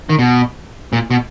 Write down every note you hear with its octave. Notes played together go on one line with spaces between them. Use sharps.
D#3
B2
A#2
B2